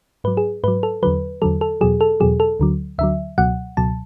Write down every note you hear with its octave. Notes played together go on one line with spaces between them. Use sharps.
G#2 F#3 B4
G#4
G#2 F#3 B4
A4
E2 D3 F#3 B4
E2 D3 F#3 A4
A4
E2 B2 F#3 G#4
A4
E2 B2 F#3 G#4
A4
D2 D3 F#3
D2 D3 F#3 E5
C#2 B2 F#3 F#5
C#2 B2 F#3 A5